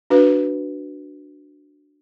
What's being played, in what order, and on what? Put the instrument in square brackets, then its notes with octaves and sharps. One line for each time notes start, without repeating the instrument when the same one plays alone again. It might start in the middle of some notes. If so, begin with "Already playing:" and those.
[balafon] D4 F#4 B4 F5